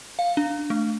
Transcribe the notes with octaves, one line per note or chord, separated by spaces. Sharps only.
F5
D4
A3